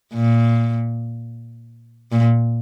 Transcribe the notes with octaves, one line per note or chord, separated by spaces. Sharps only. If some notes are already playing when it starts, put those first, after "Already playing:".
A#2
A#2